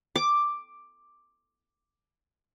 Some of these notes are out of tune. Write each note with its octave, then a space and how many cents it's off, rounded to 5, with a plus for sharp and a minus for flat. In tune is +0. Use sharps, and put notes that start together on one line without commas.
D6 +5